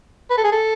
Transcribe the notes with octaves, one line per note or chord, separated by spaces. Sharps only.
B4
A4
G#4
A4